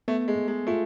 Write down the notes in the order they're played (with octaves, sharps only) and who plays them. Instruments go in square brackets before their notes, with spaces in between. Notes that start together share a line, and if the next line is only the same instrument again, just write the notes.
[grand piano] A3 [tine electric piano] B3
[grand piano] G#3
[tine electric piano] B3
[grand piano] G#3
[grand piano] A3 [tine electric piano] F4